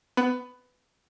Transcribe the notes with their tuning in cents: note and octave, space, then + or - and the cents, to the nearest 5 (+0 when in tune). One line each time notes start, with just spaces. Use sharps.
B3 +15